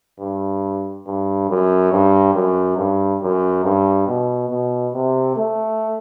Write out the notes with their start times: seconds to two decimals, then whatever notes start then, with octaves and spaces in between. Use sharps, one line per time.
0.20 G2
1.06 G2
1.50 F#2
1.92 G2
2.34 F#2
2.77 G2
3.22 F#2
3.64 G2
4.07 B2
4.50 B2
4.93 C3
5.37 A3